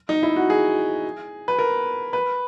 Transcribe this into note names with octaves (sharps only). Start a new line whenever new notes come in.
D#4
E4
F#4
G#4
B4
A#4
B4